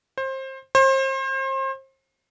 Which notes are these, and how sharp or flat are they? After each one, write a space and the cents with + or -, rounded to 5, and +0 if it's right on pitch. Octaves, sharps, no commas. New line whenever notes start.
C5 +25
C5 +35